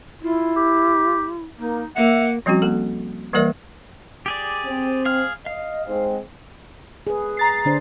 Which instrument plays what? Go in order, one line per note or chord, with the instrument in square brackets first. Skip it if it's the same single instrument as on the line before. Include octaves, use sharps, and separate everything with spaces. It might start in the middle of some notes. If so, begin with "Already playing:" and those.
[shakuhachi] E4 [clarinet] F4
[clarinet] G4
[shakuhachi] A#3 [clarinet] D#4
[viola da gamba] A#3 [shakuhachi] E5 [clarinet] F#5
[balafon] F3 G3 C4 C#4 F#4
A#3 A4
E3 G3 A#3 A#4 D5 E5
[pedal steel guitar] G4 G#4 D5
[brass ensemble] C4
[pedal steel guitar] G#4 F5 F6
[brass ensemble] D#5 [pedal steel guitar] F5
[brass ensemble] G#2 G#3 C4
[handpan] G#4 B4
[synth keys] A#5 A6 C7
[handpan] D3 D4 C5